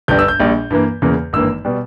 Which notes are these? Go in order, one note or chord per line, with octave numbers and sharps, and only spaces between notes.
G1 G2 G3 G6
E6
G6
A#1 A#2 G3
G2 E3 A#3
E2 C#3 E3 A#3
G#1 G2 E3 A#3 E6
B2 G3